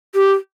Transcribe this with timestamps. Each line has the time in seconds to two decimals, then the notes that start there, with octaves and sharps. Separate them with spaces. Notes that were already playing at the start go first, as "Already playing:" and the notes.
0.15 G4